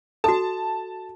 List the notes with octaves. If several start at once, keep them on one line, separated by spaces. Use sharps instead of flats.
F#4 A4 A5